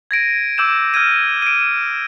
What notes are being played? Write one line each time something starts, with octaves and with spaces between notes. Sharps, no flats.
G#6 A#6 D7 D#7
D6 E6 G6 E7
F6 G6 G#6 D#7
D7 D#7